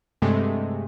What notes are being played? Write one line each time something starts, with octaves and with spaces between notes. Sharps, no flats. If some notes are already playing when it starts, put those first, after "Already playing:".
G2 C3 G#3 A3